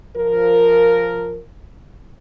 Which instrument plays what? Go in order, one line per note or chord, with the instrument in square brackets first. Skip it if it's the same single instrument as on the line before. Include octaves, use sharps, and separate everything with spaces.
[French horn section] F3 A#4